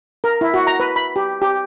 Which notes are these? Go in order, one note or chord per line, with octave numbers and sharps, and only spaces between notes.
A#4
E4
F#4
A#5
B4
B5
G4
G4